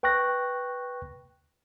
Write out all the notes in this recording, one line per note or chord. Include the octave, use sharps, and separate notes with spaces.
B4 G5 C#6 F#6 A#6